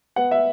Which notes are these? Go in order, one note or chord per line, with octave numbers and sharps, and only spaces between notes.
B3 F#5
E5